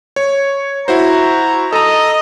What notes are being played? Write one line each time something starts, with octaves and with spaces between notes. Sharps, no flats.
C#5
E4 F#4 C5 A#5
A4 D#5 A#5